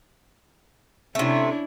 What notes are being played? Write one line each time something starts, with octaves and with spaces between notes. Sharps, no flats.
C3 A3 C#4 D4 E4